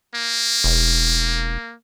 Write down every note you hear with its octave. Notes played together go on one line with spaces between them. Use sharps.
A#3
E1